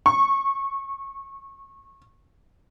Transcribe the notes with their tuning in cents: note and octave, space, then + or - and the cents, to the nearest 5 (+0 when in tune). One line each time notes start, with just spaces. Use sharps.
C#6 -20